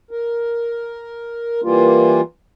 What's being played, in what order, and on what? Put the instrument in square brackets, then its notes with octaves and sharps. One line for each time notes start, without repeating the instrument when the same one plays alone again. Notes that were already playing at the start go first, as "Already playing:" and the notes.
[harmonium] A#4
E3 G3 A#3 F4